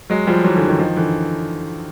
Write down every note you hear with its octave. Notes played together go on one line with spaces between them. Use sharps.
F#3 G#3
F3 G3
E3 F#3
D3 E3
D#3 F3
D#3 F3
D3 E3